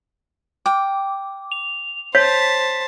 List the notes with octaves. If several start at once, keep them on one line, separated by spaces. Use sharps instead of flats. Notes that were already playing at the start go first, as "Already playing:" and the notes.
G5 D6
F7
C5 C#5 A5 B6